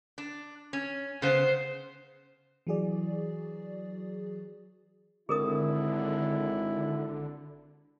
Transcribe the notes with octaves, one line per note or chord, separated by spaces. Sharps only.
D4
C#4
C#3 B3 C5
E3 F#3 F#4 G#4 D5
G#1 D3 E4 G#4 A#4 D#6